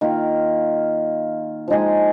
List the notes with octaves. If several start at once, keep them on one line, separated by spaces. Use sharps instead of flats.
D#3 A#3 F4
F3 G#3 D#4 G#4